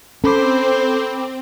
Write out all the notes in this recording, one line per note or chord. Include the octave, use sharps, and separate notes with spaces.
C4 C#4 A4 C5 B5 D6